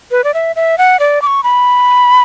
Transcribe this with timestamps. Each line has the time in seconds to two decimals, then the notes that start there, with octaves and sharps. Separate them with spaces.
0.11 B4
0.24 D5
0.34 E5
0.56 E5
0.78 F#5
1.00 D5
1.22 D6
1.27 C#6
1.44 B5